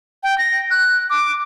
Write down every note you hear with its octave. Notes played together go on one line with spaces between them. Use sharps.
G5
A#6
F#6
D6